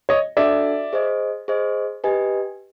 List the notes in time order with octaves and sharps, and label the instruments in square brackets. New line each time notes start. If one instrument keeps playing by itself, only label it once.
[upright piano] C#5 D#5
[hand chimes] D4 F#4 A4 [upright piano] D5 E5
[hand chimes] G#4 C5 D#5
G#4 C5 D#5
G4 B4 D#5 G#5